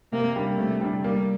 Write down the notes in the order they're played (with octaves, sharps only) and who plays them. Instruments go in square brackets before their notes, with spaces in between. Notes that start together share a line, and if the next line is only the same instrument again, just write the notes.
[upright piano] C3 [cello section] A#3
[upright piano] G3 D4
[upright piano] C3 [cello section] A3
[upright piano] G3 D4
[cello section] G3 [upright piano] A#3